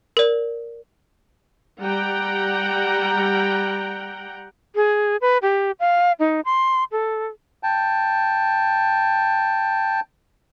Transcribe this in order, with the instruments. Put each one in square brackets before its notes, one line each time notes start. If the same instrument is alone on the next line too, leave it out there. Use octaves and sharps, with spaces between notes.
[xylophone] A#4 D5
[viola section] G3 F#5 G5 A#5
[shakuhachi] G#4
B4
G4
F5
D#4
C6
A4
[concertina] G5 A5